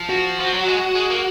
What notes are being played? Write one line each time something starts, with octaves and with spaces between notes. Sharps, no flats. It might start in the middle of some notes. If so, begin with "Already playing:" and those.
Already playing: F3
F#4
F3
F#3
G#3
G#3
A#3